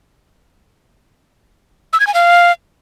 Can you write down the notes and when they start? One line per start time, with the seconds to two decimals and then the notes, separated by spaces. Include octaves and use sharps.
1.93 E6
2.00 G#6
2.07 G#5
2.14 F5